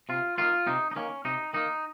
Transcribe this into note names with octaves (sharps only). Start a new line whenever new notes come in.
C3 F4
D#3 A#3 F4
C3 D#4
D#4
D#3 A#3 C#4
C3 D#4
D#3 A#3 D#4